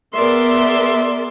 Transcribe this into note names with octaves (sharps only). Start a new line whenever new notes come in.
B3 G#4 A#4 D5 E5 C6